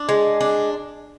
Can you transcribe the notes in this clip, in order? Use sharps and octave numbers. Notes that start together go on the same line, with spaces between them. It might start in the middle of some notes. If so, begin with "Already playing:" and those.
Already playing: D4
G#3
D4